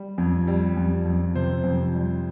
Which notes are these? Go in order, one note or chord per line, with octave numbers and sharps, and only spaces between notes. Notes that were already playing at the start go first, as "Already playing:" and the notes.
Already playing: G3
F2
G3
F2
F2
C3 C5
F2
G3